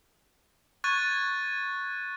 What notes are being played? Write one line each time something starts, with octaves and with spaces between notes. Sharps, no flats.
C#6 F#6 G#6 A6 D#7